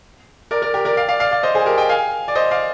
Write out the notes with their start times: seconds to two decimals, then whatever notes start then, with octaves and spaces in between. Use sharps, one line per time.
0.51 A#4 D5
0.62 A#4 D5
0.74 G4 A#4
0.85 A#4 D5
0.97 D5 F5
1.09 D5 F5
1.20 D5 F5
1.32 D5 F5
1.43 C5 D#5
1.55 G#4 C5
1.66 G4 A#4
1.78 D#5 G5
1.89 F5 G#5
2.28 D5
2.35 C5 D#5
2.51 D5 F5